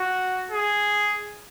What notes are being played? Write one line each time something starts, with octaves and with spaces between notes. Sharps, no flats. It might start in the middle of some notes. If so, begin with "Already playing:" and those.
Already playing: F#4
G#4